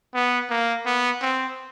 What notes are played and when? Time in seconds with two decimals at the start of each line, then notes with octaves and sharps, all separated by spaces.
0.14 B3
0.50 A#3
0.86 B3
1.22 C4